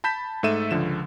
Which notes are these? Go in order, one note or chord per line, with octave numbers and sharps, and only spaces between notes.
A5 B5 G6 B6 E7
G#2 A3 A4 E5 D#7 E7
C#2 D3 F3 E7